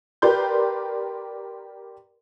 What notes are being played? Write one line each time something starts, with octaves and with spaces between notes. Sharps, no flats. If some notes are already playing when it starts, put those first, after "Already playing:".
G4 A#4 B4 D5 C6 G6